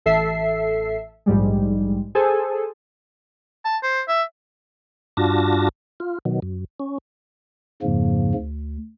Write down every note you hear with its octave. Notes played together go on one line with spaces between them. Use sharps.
A1 A4 E5 C7
A#1 G#2 G3 G#3
G#4 A4 C5 G#5
A5
C5
E5
G2 D4 F4 F#4 A5 A#6
F4
B2 D#3 F#3
F#2
C#4
F2 G#2 C#3 F3 A#3
D2